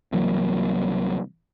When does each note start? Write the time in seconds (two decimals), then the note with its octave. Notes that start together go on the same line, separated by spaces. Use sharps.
0.12 C2 E3 F#3 A#3